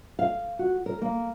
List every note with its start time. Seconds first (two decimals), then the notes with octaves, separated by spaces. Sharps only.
0.19 F5
0.59 F#4
0.86 A#4
1.02 A#3